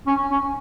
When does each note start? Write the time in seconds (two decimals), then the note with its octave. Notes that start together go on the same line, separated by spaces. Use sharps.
0.07 C#4
0.31 C#4